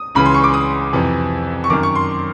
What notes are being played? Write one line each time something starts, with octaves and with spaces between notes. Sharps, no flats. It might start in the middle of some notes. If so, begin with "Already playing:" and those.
Already playing: D#6
C#2 C#3 E3 B5
C6
C#6
D6
D#6
F2 C3 E3
C#6
F#2 D#3 D6
C#6
C6